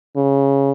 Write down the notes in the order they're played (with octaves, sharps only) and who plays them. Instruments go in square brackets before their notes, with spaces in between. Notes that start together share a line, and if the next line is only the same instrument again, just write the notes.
[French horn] C#3